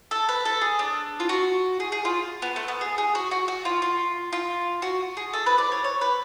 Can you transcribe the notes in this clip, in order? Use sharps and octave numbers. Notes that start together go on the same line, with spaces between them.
A4
B4
A4
G#4
D4
F4
F#4
G#4
G#4
F4
B3
A3
B3
G#4
G#4
F#4
F#4
F#4
F4
F4
F4
F#4
G#4
A4
B4
D5
C#5
C#5
B4